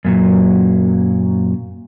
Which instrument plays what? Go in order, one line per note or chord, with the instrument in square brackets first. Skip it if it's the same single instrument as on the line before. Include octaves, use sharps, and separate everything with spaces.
[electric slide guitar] F#2 A#2 F#3